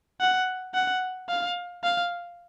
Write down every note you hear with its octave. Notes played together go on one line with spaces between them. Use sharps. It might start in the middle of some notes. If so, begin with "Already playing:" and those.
F#5
F#5
F5
F5